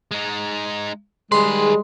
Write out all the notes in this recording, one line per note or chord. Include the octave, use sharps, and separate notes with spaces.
G#3 D#4
D#3 G3 G#3 G#4 B4 C6